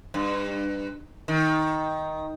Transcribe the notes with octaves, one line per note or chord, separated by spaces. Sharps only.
G2
D#3